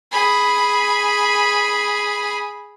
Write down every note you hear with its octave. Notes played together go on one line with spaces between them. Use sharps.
G#4 B5